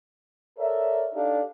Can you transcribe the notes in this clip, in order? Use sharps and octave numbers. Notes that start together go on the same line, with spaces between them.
A4 A#4 C#5 D5 E5
D4 D#4 G4 A4 D5 F5